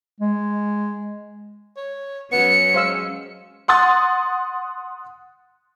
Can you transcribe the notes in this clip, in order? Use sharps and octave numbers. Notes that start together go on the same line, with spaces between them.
G#3
C#5
F#3 B3 C#4 C#7
G#3 C5 F5 E6
F#5 C6 D#6 A6